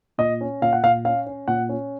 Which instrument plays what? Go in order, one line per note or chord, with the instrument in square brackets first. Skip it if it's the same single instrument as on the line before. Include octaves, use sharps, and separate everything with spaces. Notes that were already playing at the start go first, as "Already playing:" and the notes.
[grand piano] A#2 D#5
C#4
A#2 F5
F#5
A#2 F5
C#4 F5
C#4
A#2 F#5
C#4